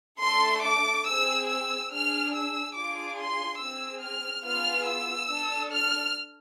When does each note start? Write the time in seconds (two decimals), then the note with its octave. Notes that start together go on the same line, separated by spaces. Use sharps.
0.22 A3 D4 A4 C6
0.65 D6
1.07 C4 G#4 E6
1.49 E6
1.91 D4 G#4 F6
2.34 E6
2.76 D4 F4 G#4 D6
3.18 C6
3.60 C4 G#4 E6
4.02 F6
4.45 B3 F4 G#4 F6
4.86 E6
5.29 D4 A4
5.71 F6